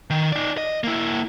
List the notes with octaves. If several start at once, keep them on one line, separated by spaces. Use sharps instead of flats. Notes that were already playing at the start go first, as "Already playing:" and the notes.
D#3
D#4 D5
D#5
A#3 E4